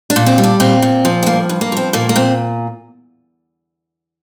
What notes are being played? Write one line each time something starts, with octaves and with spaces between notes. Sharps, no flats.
D4
A#2
C4
G3
D4
A#2 C4
A#2
F3
C4
G2 A#3
G2
A#3
F3 C4
A#2 A#3
A#3
A#2 C4